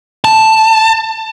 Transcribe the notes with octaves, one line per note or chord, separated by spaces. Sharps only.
A5